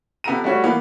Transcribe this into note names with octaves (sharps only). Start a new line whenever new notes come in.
C3 B3 A4 A#5 D#7
G3 A3 F#4 C#5
E3 A#3 B3